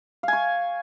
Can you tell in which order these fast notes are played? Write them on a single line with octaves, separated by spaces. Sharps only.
F5 G#5 C#6